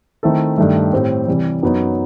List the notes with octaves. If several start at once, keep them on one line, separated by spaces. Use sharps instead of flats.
D#3 A3 C4 E4 A4
G2 D#3 A3
A2 G3 C4
C3 E3 G3
F#2 F#3 B3 D#4